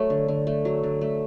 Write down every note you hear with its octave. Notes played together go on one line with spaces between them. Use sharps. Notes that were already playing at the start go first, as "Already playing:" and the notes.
Already playing: F#3 A3 C#5
D3
D3
A3
F#3
D3
A3